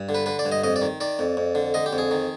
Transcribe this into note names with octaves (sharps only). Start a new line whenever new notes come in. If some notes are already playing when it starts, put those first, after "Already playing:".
Already playing: G2
D3
B4
D3 B4
D5
G2
D#5
F2 D#5
D5
D#3
D#3 D5
F2
F2
D3
D3 D#5
G4
F2
G#4
D#3